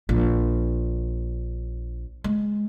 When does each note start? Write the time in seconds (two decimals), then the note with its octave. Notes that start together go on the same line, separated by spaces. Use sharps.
0.09 A#1
2.24 G#3